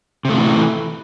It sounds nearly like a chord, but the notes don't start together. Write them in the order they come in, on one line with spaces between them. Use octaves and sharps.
C3 A3 F3 E3